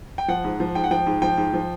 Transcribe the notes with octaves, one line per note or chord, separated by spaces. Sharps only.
G5
F3 F#5
G#2
F3
G#2 G5
F#5
F3 G5
G#2
F3 G5
G#2
F3